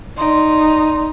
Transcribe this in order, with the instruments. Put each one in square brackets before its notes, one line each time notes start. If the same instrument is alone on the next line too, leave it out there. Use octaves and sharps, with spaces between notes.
[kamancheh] D#4 [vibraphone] D5 C6